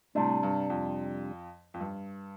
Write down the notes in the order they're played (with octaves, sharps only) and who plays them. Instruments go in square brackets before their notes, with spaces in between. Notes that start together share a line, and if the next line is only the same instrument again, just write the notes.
[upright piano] A2 [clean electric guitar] C3 G3 D4
[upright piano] G2
F2
F2
G2